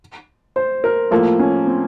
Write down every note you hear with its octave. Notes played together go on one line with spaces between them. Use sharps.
C5
A#4
A2 F3 A#3 A4
C#4
C4